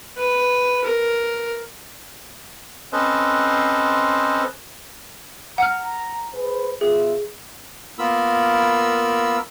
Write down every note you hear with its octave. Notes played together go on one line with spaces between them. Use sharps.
B4
A#4
C4 C#4 A4 B4 C5 D#5
F#5 A#5 F6
G#4 B4 C5
B2 F4 G#4 E5
A#3 B3 F4 A#4 B5 E6